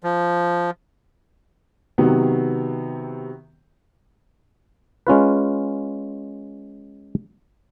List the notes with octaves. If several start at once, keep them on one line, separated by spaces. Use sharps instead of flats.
F3
C3 D#3 F#3 B3
G#3 C#4 F4 B4